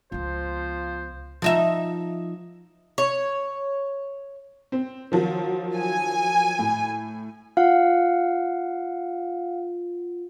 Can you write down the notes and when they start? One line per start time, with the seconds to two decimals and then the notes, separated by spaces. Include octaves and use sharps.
0.12 C#2 F3 B3 C5
1.42 F3 D#4 E5
2.98 C#5
4.72 C4
5.12 D#3 F3 F#3
5.76 G#5
6.59 A2
7.57 F4 F5 F#5